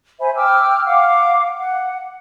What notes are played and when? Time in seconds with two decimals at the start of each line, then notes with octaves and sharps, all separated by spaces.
0.20 C5 E5 G#5 B5
0.35 G5 D6 E6 F6
0.85 F5 F#5 D6
1.59 F#5